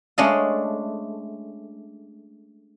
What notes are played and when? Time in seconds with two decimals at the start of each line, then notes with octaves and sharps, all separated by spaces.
0.18 G#3 A3 C#4 D4 D#5 F5